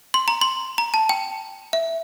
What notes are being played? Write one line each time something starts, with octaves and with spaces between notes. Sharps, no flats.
C6
A#5
C6
A#5
A5
G5
E5